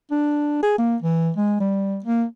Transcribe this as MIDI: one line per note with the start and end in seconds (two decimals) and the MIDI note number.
0.11 0.59 62
0.63 0.75 68
0.78 0.96 58
1.02 1.31 52
1.37 1.57 56
1.60 1.99 55
2.04 2.24 58